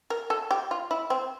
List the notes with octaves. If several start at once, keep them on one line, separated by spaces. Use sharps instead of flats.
A#4
A4
G4
F4
E4
C4